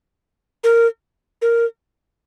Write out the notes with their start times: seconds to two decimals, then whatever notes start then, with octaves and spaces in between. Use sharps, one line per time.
0.64 A#4
1.42 A#4